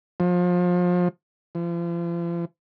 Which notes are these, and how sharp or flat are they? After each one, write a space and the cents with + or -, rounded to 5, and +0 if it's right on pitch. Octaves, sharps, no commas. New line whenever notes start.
F3 +30
F3 -40